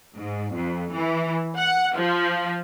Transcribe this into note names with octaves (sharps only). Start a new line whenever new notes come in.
G#2
F2
E3
F#5
F3